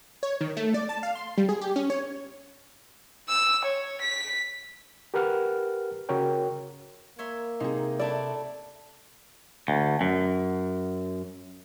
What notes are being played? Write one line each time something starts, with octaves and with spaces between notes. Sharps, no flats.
C#5
D#3
A3
D5
A5
F5
C6
G3
G#4
G4
C#4
C#5
E6
C#5
B6
G4 A#4 B4 F#5 F6
C#3 F#4 A#4 C#5 G5
A#3 C#5 E5 C6
C3 D#4 G#4
A3 D4 E4 D5
D2
F#2